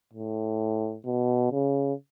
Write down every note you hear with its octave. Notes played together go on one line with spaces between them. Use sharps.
A2
B2
C#3